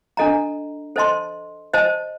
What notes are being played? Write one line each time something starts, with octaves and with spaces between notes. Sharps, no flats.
D4 A4 D#5 A#5
A4 C5 D#5 A5 C6
C5 D#5 A5